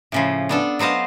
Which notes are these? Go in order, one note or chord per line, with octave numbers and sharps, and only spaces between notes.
A2 C#3 F3
B3 D4 A4
F#3 B3 C5 D#5 F5